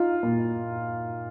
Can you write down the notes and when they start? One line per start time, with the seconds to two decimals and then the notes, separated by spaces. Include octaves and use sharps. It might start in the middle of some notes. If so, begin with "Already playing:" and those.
Already playing: D#4 F4
0.23 A#2